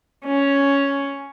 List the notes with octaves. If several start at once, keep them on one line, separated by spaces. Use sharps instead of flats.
C#4